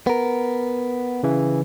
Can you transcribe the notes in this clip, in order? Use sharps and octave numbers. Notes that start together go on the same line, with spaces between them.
B3 A#4
C#3 E3